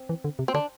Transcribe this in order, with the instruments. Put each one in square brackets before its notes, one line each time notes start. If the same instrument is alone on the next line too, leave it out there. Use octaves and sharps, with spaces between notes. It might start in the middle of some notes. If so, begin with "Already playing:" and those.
Already playing: [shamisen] C4
[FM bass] E3
D3
C3
[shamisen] C4
[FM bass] D3 [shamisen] D4